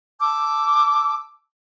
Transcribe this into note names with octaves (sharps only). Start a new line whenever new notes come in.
A5 D6 E6